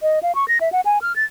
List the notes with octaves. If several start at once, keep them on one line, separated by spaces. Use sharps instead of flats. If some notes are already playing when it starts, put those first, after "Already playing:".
D#5
F5
C#6
A#6
E5
F#5
G#5
F6
A6